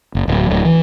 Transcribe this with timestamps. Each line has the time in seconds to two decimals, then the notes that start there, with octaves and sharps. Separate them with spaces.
0.15 F#1
0.28 D1
0.50 D1
0.65 E3